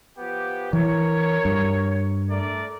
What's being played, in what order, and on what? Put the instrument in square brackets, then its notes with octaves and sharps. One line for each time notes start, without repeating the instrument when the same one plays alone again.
[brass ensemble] F3 B3 G4
[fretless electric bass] E3 [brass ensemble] A#4 C#5
[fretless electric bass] G2
[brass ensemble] A3 A#4 D5